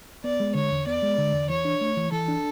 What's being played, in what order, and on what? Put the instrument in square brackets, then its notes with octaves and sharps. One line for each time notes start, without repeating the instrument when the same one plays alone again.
[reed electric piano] B3 [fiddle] D5
[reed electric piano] G#3
[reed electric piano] D3 [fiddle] C#5
[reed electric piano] E2
[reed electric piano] B3 [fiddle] D5
[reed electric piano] G#3
D3
E2
[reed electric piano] E3 [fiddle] C#5
[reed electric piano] D4
A3
E3
[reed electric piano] E3 [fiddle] A4
[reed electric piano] D4